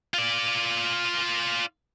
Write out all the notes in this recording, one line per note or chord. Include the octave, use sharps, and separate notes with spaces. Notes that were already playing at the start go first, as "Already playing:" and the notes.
F4 D5